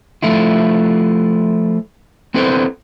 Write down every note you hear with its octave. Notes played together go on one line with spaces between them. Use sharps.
F3 A3 E4 F4
B3 C4 E4 A4 B4 C5